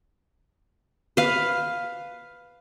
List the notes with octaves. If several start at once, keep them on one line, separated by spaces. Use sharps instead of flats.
B4 F5